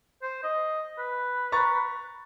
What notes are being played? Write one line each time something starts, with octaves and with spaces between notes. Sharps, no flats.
C5
D#5
B4
A#5 C#6 A6